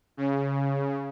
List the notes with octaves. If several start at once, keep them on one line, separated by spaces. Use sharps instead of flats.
C#3